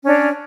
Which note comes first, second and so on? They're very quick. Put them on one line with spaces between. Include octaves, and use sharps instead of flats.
C#4 D4 C#5